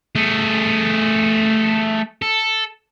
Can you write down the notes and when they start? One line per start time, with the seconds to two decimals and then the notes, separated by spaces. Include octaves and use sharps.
0.15 A3 G#4
2.22 A4